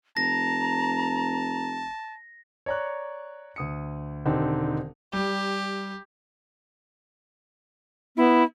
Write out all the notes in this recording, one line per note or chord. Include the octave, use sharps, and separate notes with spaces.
F1 A5 A#5 A#6
C#5 D5 A#5 C#6 F#6
D2 D#6 C#7
E1 D3 D#3 C4 D#4 G4
G3 G4
B3 E4